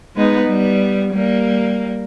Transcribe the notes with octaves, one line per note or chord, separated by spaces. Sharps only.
G#3 B3 D#4
G3 B3
G3 A#3